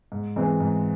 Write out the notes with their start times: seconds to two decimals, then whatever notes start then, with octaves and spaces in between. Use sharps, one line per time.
0.12 G#2
0.36 E3 G#3 C4
0.60 G#2